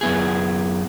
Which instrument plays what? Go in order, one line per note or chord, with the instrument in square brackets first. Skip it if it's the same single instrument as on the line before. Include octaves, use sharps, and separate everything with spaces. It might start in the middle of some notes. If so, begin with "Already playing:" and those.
[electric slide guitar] F#2 B3 G#4